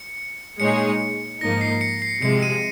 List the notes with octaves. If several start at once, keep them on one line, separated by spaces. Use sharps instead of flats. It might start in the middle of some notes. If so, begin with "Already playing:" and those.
Already playing: C#7
A#2 G#3 D#4 G#4 C#5 C#7
G#2 F3 A#3 D#4 A#6
C7
C#7
C7
C3 F3 G#3 C#7
D#7